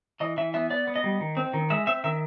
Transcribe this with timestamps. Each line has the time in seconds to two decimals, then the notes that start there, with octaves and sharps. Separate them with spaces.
0.20 E3 D#5
0.37 E3 E5
0.54 B3 E5
0.70 B3 D5
0.87 B3
0.96 D#5
1.04 G3
1.21 D#3
1.37 C4
1.53 D#3
1.70 G#3 E5
1.87 C4 E5
2.04 D#3 E5